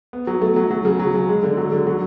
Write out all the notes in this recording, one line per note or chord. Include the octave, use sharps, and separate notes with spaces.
B3
F#3
A3
F#3
F#3
C#3
F#3
C#3
G#3
D3
F#3
D3
F#3